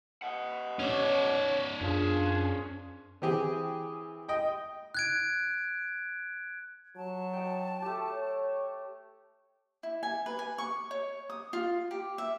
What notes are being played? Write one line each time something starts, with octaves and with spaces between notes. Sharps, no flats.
D#5 F#5
C#4 C#5 D5
F#2 D4 F4 G#4
E3 C4 G4 G#4
D#5 G5
F#6 G#6 D7
F#3 A5
D#5 G5
A3 G4
C#5
E4
G#5
B4
G#5
C#6
C#5
D#6
F4
G4
E5